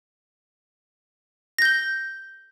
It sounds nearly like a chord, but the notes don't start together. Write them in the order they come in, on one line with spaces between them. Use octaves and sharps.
A#6 G6 G7